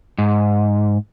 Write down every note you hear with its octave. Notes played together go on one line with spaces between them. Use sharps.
G#2